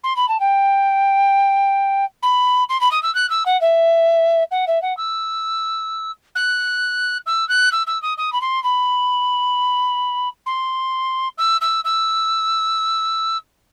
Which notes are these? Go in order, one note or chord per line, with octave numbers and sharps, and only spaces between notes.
C6
B5
A5
G5
B5
C6
B5
D#6
E6
F#6
E6
F#5
E5
F#5
E5
F#5
E6
F#6
E6
F#6
E6
E6
D#6
D#6
B5
C6
B5
C6
E6
E6
E6